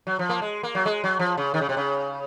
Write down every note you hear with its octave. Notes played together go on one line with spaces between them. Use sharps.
F#3
F3
A#3
G#3
A#3
F#3
G#3
F#3
F3
C#3
D#3
C#3
C3
C#3